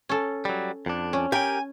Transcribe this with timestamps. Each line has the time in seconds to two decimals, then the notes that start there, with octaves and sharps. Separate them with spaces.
0.09 C#4 A4
0.45 F#3 G3
0.86 F2 D4
1.13 C#4
1.32 G4 A#4 G5 G#5